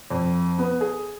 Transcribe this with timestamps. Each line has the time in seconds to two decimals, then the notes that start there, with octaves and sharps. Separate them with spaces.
0.11 F2
0.58 B3
0.81 G#4